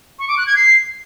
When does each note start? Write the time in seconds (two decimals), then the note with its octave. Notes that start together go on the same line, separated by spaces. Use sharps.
0.19 C#6
0.28 D6
0.38 F#6
0.47 G#6
0.56 C7